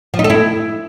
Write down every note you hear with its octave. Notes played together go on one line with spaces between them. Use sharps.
F3
D#4
A4
E4